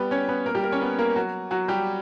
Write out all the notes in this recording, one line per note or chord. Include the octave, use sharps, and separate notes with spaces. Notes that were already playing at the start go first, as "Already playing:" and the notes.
Already playing: G3 B3 G4 B4
C#4 C#5
B3 B4
A#3 A#4
G3 G4
A#3 A#4
C#4 C#5
B3 B4
A#3 A#4
F#3 F#4
F#3 F#4
G3 G4